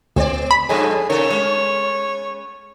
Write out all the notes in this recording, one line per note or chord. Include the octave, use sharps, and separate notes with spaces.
D2 B3 D5
B5
G2 B2 F3 D4 G#4 A4 C#5
C3 D#4 A4 A#4 C#5
G#3 B3 C#4